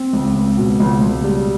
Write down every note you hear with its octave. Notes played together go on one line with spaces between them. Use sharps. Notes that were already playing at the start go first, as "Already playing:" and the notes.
Already playing: C4
C#2
C#2
B2
C#2
C#2
G3